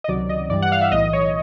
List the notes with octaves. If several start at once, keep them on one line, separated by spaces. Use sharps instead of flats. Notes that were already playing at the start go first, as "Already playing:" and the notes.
D#5
C#2 C3 D#3 F#3 D5
D#5
G2 E3 G3 D5
F#5
F5
E5
B1 A2 E3 D#5
C#5